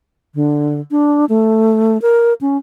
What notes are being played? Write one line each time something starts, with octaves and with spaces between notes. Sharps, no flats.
D3
D4
A3
A#4
C#4